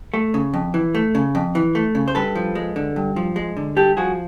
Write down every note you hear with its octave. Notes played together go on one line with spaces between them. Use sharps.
A3
C#3
F2
E3
A3
C#3
F2
E3
A3
C#3
C5
G2 A4 B4
F3
G#3
D3
G2
F3
G#3
D3
G2 G4 A4
F3 F#4 G#4